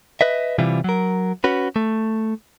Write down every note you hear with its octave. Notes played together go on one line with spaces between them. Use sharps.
B4 D#5 E5
C3 E3 G3 E4 F4
F#3 A#4
C#4 F#4 B4
A3